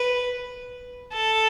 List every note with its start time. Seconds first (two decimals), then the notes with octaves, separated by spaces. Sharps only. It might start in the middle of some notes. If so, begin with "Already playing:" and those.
Already playing: B4
1.13 A4